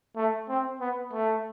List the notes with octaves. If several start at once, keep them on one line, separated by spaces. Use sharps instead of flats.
A3
C4
B3
A3